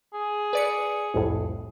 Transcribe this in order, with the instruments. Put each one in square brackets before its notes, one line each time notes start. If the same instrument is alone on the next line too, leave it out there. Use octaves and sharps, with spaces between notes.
[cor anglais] G#4
[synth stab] B4 D5 C#7
C2 F2 A2